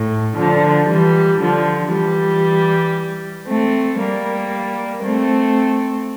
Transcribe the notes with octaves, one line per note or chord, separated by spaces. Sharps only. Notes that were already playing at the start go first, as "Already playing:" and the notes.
Already playing: A2
D3 F3
E3 G3
D3 F3
E3 G3
A3 C4
G3 A#3
A3 C4